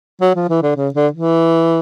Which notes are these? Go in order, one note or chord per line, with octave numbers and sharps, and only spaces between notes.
F#3
F3
E3
D3
C#3
D3
E3